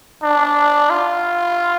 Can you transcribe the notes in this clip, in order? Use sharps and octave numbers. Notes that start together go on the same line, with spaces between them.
D4
F4